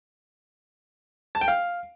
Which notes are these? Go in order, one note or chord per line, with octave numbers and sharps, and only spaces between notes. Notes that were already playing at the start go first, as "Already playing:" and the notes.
A5
G5
F5